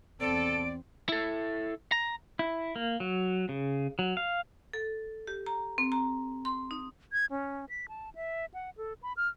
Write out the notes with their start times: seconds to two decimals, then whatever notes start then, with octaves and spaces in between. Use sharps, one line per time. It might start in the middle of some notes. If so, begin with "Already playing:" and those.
0.21 E2 C4 A4 D5 D7
1.09 E4 A4
1.92 A#5
2.39 E4
2.76 A#3
3.00 F#3
3.49 C#3
3.99 F#3
4.17 F5
4.73 A4
5.27 G4
5.46 A#5
5.78 C4
5.92 A#5
6.45 C6
6.71 D#4
7.12 G#6
7.31 C#4
7.69 B6
7.89 A5
8.15 E5
8.54 F#5
8.77 A4
9.03 B5
9.17 F6